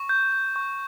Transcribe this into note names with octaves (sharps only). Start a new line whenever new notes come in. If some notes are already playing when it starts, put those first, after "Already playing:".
Already playing: C#6
G6
G6
C#6